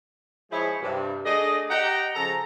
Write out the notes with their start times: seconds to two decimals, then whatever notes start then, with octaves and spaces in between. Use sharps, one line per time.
0.51 F3 G#3 E4 G#4 C5 C#5
0.82 G2 C3
1.25 A3 D4 G#4 D5 D#5
1.70 G4 D#5 F#5 G5 A#5
2.15 C#3 F3 A4 A#5